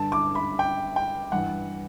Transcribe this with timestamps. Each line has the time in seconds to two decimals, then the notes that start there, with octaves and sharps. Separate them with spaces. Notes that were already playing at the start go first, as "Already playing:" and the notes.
Already playing: G2 D3 A5
0.12 D6
0.35 B5
0.59 G5
0.96 G5
1.32 G2 E3 F#5